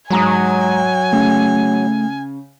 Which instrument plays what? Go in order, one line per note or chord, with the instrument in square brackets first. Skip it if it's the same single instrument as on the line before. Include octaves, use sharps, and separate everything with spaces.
[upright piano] G#2 A#5 D#6 [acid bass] F#3 [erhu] G#5
[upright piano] C#3 [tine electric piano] A3